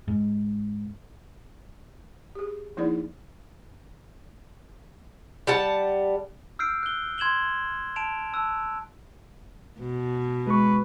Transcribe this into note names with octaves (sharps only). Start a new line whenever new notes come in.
G#2
G4 G#4
F3 A#3 D#4 E4 G#4 D5
G3 F#5 A5
E6 F6 G6 C7 D7
F#6 G7
C6 G#6 E7 F#7 G7
A5 D7 E7 F7
A5 E6 F#6
B2
G#3 B4 C#6